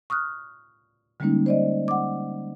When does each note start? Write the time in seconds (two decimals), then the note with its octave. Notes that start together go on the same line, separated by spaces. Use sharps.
0.10 C#6 D#6 F6 F#6
1.20 D3 G3 G#3 A#3 C#4 D#4
1.46 C5 D5 D#5
1.88 F#5 D6